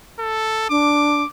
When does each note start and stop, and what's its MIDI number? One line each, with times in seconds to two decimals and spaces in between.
0.19 0.69 69
0.70 1.22 62
0.70 1.27 86